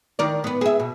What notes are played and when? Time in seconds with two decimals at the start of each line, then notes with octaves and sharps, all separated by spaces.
0.19 D#3 A#4 D5
0.44 B3 B4
0.61 G#4 E5
0.80 B2